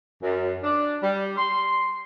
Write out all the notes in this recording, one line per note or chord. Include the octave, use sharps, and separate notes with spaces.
F#2
D4
G3
C6